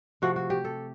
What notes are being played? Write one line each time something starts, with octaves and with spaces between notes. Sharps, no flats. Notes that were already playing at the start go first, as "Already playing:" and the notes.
C3 F3 A3 F#4
F#4
G4
A4